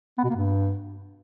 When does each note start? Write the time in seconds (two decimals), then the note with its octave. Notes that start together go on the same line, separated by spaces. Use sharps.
0.18 B3
0.24 B2
0.30 A#3
0.36 G2